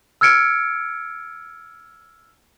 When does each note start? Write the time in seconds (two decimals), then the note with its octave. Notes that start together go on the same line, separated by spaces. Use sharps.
0.21 E6 F6 G#6 C#7 D7